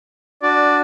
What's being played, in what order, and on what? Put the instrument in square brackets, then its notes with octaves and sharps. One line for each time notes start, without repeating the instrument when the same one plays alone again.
[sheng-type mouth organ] D4 F#4 [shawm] D5